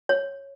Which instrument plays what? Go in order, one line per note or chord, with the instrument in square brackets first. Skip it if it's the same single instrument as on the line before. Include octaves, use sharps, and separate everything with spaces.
[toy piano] C#5